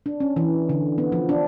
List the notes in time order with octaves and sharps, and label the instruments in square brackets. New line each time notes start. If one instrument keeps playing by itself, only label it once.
[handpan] D4
C#4
E3
D3
B3
F3
D4